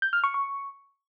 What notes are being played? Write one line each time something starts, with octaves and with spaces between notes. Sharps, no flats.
G6
F6
C#6
C#6